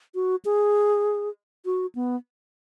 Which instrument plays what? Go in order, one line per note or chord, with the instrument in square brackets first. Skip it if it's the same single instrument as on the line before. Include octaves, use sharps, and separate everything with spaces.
[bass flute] F#4
G#4
F#4
B3